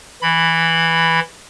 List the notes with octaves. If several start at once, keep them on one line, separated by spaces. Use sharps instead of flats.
E3 B5